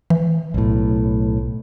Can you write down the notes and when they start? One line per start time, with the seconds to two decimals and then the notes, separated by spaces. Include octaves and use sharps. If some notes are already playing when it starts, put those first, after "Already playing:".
0.10 E3
0.54 B1 A2